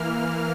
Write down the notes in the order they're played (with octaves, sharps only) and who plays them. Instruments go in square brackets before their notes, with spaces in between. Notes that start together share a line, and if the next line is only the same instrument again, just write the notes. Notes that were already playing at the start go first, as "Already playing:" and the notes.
Already playing: [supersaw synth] E3 A#3 F6